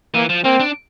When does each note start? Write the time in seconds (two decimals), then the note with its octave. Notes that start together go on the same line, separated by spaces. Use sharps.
0.15 E3 A#3
0.29 F3
0.44 A#3 C4
0.60 D4